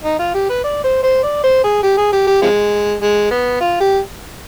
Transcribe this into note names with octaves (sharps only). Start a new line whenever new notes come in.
D#4
F4
G4
B4
D5
C5
C5
D5
C5
G#4
G4
G#4
G4
G4
C3 F3 G#3
G#3
B3
F4
G4